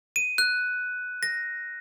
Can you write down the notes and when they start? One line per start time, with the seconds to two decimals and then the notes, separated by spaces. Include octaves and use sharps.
0.16 D#7
0.38 F#6
1.23 A#6